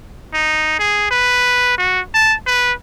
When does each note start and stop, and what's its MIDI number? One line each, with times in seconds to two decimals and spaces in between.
0.34 0.78 63
0.79 1.07 68
1.11 1.75 71
1.78 2.00 66
2.14 2.35 81
2.47 2.73 71